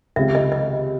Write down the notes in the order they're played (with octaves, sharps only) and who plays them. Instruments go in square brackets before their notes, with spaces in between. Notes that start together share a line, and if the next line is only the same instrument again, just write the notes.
[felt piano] C#2 C3 D#3 G#3 [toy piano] E5
[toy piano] D#5
D#5